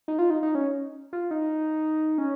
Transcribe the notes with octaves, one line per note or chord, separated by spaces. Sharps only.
D#4
F4
D#4
D#4
C#4
F4
D#4
C#4